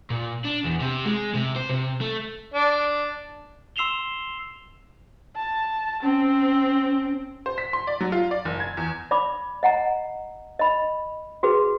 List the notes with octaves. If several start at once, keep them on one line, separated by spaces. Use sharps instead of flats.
A#2
D4
E2
C3
G#3
C3
C5
C3
A3
D4
C6 E6 C7 E7 F7 G7
A5
C4 C#4
C5
B6
C6
D5
F#3
F4
D5
F#1
G#6
E2
D5 B5 D6
D#5 F#5 G#5 A#5
D#5 B5
F#4 G#4 B4